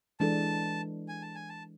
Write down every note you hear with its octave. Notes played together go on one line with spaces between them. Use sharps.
E3 G#3 D4 A4 A5
G#5
A5
G#5
A5